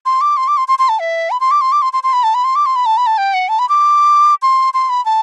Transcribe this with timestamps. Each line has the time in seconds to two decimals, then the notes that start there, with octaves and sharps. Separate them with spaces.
0.06 C6
0.21 D6
0.37 C6
0.48 D6
0.57 C6
0.68 C6
0.79 C6
0.89 A5
0.99 E5
1.31 B5
1.40 C6
1.51 D6
1.61 C6
1.72 D6
1.82 C6
1.93 C6
2.04 C6
2.13 B5
2.23 A5
2.34 B5
2.44 C6
2.56 D6
2.66 C6
2.76 B5
2.86 A5
2.97 B5
3.07 A5
3.18 G5
3.34 F#5
3.49 A5
3.59 B5
3.69 D6
4.42 C6
4.74 C6
4.89 B5
5.05 A5